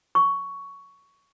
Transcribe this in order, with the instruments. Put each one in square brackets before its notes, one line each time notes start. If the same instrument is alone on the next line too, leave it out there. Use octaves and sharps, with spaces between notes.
[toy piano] C#6